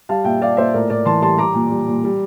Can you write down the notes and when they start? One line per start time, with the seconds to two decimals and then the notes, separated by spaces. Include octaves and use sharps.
0.09 G3 F5 A5
0.24 A#2 E5 G5
0.42 G3 D5 F5
0.57 A#2 C5 E5
0.74 A2 A#4 D5
0.90 A2 A#4 D5
1.05 E3 A5 C6
1.22 G3 A5 C6
1.38 G3 A#5 D6
1.54 A#2
1.71 G3
1.88 A#2
2.04 G3